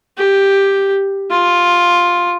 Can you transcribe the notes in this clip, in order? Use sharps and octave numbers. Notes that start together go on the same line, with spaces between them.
G4
F4